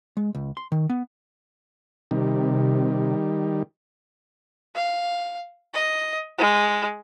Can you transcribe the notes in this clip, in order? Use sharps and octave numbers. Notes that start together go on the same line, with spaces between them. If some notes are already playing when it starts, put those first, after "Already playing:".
G#3
C#2
C6
D#3
B3
C3 D#3 G3
F5
D#5
G#3